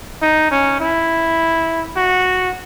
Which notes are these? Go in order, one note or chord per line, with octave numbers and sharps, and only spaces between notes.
D#4
C#4
E4
F#4